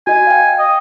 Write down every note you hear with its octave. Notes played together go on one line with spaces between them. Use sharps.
F#4 D#5 G#5
F5 G5
D#5